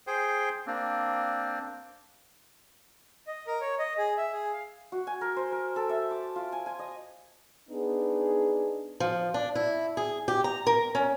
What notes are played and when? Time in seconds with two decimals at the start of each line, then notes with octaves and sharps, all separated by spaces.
0.07 G#4 C5 G5
0.67 A#3 C4 D4
3.27 D#5
3.47 A#4
3.61 C#5
3.79 D#5
3.98 G#4
4.17 E5
4.32 G#4
4.53 F5
4.92 F#4
5.07 G#5
5.21 A#4
5.36 C5
5.52 A#4
5.76 A4
5.89 E5
6.11 D6
6.36 F4
6.52 G#5
6.66 G#5
6.79 D#5
7.70 B3 D4 D#4 G#4
9.00 F3
9.34 D4
9.55 E4
9.97 G#4
10.28 G4
10.44 A#5
10.67 A#4
10.95 C#4